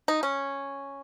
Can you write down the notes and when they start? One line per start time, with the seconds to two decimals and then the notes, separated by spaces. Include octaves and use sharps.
0.08 D#4
0.23 C#4